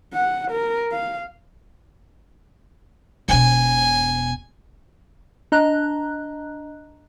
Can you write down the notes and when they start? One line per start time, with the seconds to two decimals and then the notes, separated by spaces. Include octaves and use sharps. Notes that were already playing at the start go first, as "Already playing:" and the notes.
0.13 F#5
0.51 A#4
0.92 F5
3.29 E1 B2 G#5
5.52 D4 D#5 A#5 F#6